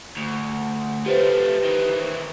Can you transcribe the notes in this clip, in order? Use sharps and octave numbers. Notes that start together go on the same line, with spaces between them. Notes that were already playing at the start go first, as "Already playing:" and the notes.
D2
F3 A3 G4 B4 C5
D#3 E3